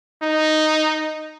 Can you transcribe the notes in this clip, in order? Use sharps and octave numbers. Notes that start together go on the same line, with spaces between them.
D#4